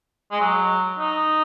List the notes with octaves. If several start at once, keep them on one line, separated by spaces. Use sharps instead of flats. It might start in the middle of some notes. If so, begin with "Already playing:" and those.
G#3
F#3
D#4